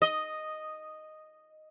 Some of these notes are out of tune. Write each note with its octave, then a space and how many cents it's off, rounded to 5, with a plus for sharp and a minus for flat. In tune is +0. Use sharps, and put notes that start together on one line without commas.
D#5 -5